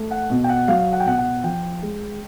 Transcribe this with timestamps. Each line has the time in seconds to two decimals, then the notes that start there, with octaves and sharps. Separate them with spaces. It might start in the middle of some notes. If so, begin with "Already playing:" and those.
Already playing: A3
0.11 F#5
0.30 B2
0.44 G5
0.49 F#5
0.68 F#3 F5
0.93 F#5
1.00 G5
1.06 B2 F#5
1.18 F#5
1.44 F3 G5
1.82 G#3